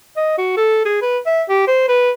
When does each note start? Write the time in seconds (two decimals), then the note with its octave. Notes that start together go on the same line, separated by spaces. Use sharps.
0.17 D#5
0.38 F#4
0.57 A4
0.85 G#4
1.02 B4
1.26 E5
1.49 G4
1.67 C5
1.88 B4